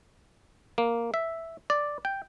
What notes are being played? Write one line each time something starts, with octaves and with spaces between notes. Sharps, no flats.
A#3
E5
D5
G5